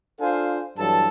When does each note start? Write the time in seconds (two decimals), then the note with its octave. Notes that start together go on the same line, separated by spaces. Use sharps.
0.20 D4 F4 A4 C5 F5 G#5
0.78 G2 E3 F#3 A4 A5